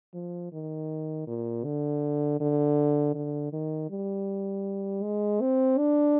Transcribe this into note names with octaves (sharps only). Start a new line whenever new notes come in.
F3
D#3
A#2
D3
D3
D3
D#3
G3
G#3
C4
D4